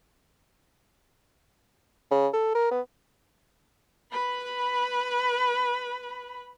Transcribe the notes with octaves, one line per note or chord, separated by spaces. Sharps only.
C#3
A4
A#4
B3
B4 B5